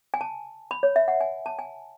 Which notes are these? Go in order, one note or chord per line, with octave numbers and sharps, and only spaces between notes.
G#5
A5
B5
C#5
E5
F#5
G#5
A5
G#5